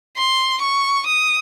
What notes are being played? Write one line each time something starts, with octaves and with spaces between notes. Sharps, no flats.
C6
C#6
D#6